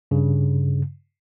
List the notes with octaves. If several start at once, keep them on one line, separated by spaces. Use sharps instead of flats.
G2 C#3